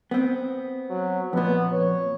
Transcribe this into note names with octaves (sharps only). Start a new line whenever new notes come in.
B3 C4
F#3
F2 A#2 B3
C#5